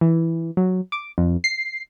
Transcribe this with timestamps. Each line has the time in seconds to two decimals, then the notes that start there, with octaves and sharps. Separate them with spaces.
0.01 E3
0.57 F#3
0.92 D6
1.18 F2
1.44 C7